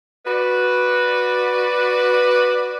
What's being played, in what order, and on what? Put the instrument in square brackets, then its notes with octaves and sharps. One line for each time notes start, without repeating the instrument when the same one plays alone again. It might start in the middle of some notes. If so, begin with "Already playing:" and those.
[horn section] F#4 B4 D5